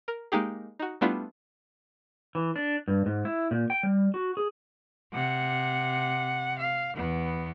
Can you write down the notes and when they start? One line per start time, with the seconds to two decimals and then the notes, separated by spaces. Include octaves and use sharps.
0.08 A#4
0.32 G#3 A#3 D#4 G4 G#4
0.79 D#4 F#4
1.01 G3 A3 B3 D4 E4 F4
2.35 E3
2.56 D4
2.88 G2
3.06 G#2
3.25 E4
3.51 A#2
3.70 G5
3.83 G3
4.14 F#4
4.37 G#4
5.13 C3 F#5
6.59 F5
6.95 E2 B3